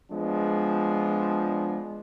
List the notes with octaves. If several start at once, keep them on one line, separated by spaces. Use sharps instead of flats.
F3 G#3 B3 D4